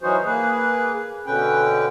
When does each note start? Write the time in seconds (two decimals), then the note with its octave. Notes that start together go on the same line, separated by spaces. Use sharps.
0.01 E3 F#3 C#4 D#4 F#4 C5
0.25 A#3 G#4 B4
1.26 B2 D3 C#4 B4 G5